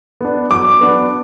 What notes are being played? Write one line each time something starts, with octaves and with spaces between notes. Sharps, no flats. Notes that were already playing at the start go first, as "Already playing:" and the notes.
B3 D4
F#3 D6
B3 D4